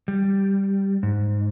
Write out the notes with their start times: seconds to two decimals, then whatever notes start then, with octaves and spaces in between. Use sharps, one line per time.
0.08 G3
1.03 G#2